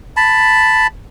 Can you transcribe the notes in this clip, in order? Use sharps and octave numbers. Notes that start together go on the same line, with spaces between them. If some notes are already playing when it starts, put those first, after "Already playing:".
A5 B5